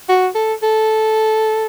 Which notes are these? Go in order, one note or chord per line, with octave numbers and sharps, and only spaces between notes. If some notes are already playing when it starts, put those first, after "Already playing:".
F#4
A4
A4